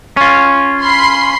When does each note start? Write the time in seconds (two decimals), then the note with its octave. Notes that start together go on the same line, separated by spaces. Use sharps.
0.17 C#4 F4
0.81 B5 C6 C7